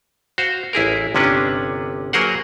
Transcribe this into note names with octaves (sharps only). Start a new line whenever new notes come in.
F#4 C5 F5
A1 E4 G#4 A#4
G1 C3 C#4 D4 B4
F#3 A#3 G#4 A#4 C5 F#5